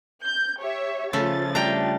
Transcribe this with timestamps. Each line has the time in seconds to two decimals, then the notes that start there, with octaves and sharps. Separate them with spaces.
0.25 G6
0.59 G4 C#5 E5
1.13 C#3 F3 A3 A6
1.55 G3 A3 D4 G5 A#5